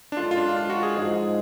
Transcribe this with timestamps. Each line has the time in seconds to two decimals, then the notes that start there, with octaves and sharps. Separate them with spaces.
0.12 D4
0.17 F#2 D3 G#3 F4
0.31 F4
0.37 D4
0.57 F4
0.70 F#4
0.83 G#4
0.95 G#2 F3 G#3 G#4